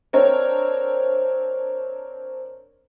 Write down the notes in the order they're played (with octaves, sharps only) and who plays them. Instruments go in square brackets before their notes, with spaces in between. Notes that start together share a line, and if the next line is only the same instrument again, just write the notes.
[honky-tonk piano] C4 D4 A#4 C#5